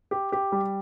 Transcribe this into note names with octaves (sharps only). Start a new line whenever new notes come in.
G4
G4
G3